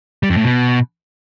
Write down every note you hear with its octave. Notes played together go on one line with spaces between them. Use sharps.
G3
F2
A2
B2